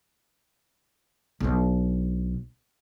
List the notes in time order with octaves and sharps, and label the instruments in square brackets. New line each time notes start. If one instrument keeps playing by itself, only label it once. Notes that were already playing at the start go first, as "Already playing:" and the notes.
[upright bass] B1 D4